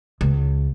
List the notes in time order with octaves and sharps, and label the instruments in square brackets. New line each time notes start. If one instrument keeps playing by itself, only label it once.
[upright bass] C#2